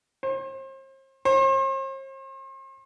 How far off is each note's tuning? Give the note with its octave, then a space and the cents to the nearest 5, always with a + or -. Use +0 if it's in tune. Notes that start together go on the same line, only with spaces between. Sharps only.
C5 +40
C5 +45